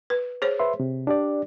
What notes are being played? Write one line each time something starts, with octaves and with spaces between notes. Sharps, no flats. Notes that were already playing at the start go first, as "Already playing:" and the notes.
B4
G#4 C5 C#5
B4 E5 C6
C3
D4 G4 D5